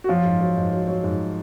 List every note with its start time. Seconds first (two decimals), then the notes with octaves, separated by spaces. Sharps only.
0.04 F#4
0.09 F3 F#3 F4
0.25 G#2
0.40 F#3
0.57 G#2
0.73 F#3
0.88 F#3
1.04 G#2